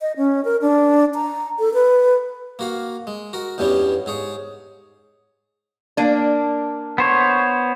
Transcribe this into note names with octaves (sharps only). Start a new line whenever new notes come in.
D#5
C#4
A#4
D4
A#5
A4
B4
A#3 F#4 F5
G#3
F#4 A#4
E2 G2 B2 G3 B3 C#4
G#2 G#4 C#5
A#3 D4
B3 C5 C#5